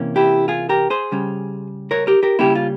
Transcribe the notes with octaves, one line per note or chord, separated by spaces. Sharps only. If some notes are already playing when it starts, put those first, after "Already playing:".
Already playing: C3 E3 A#3 C#4
E4 G4
F4 G#4
G4 A#4
G#4 C5
C#3 G3 C#4
A#4 C#5
G4 A#4
G4 A#4
C#3 E3 G3 A#3 C#4 E4 G4
F4